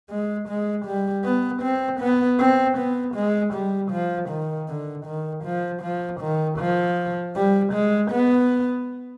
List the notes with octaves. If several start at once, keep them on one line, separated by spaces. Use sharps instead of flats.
G#3
G#3
G3
B3
C4
B3
C4
B3
G#3
G3
F3
D#3
D3
D#3
F3
F3
D#3
F3
G3
G#3
B3